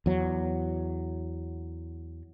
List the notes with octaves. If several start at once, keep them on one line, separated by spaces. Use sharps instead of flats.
E2 F#3